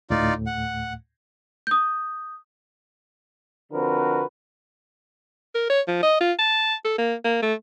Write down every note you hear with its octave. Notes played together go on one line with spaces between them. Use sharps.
D2 A2 A3 D#4 F4 D5
F#5
D#6 G6
D3 F3 C4 F#4 A#4 B4
A#4
C#5
F3
D#5
F4
A5
A4
A#3
A#3
A3